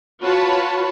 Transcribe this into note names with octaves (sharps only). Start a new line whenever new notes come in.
F4 F#4 B4 C#5 A5 B5